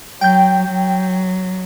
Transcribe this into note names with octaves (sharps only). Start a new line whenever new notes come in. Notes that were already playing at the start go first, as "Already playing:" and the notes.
F#3 G5 G6
F#3